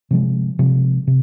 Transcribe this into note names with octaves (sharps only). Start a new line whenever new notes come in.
C3 F3 G#3
C3 F3 G#3
C3